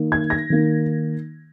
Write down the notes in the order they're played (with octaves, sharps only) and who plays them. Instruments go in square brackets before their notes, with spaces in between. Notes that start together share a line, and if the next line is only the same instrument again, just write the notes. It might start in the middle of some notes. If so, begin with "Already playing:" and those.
Already playing: [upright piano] D#3 A#3 D#4
G#6
A#6
D#3 A#3 D#4